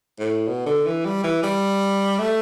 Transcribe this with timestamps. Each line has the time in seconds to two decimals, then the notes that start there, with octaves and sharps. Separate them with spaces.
0.20 A2
0.47 B2
0.66 D3
0.86 E3
1.05 G3
1.24 E3
1.43 G3
2.19 A3